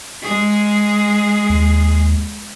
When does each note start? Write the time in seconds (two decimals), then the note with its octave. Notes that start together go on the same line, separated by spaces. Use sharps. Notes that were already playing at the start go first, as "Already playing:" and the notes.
0.22 G#3 G#4
1.49 D#2